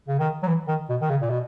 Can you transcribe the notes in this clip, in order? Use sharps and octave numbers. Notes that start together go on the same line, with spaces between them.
C#3
D#3
F#3
E3
D#3
B2
D#3
C#3
A#2
B2